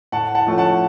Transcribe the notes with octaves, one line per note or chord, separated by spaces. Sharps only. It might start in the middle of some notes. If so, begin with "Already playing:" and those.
A2 F#5 A5
F#5 A5
F3 A3 C#4
F#5 A5